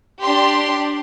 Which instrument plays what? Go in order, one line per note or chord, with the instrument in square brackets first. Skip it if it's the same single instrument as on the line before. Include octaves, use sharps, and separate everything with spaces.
[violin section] D4 G4 C6